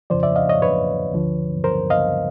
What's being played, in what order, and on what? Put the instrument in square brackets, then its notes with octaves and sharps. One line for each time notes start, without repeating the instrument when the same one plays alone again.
[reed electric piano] F2 C#3 F3 C5 D5
D5 E5
D#5 F5
C#5 D#5
B4 C#5
D2 D3 F3
A#4 C5
D#5 F5